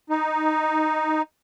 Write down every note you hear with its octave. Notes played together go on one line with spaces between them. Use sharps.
D#4